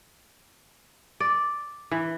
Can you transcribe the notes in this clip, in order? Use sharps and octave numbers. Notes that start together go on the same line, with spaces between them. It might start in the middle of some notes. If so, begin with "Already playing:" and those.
D5
E3